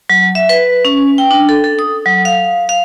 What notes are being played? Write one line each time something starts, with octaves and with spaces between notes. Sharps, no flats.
F#3
E5
B4
C#4
G5
D4
A4
A4
D#6
F#3
F5
F5